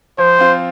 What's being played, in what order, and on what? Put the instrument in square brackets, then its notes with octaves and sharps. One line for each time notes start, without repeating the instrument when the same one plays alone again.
[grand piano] F3 [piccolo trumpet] C5
[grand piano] C4 F4